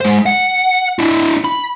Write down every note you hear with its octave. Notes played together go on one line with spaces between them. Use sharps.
G#3 C5
F#5
D4 E4
B5